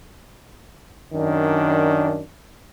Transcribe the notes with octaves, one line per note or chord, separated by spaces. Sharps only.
F#2 D#3 D4